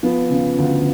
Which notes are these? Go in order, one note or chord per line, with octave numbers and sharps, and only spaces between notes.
F3 B3
C#3
D2